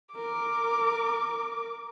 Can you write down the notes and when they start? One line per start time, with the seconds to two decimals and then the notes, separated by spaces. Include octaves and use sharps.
0.15 A#4 D6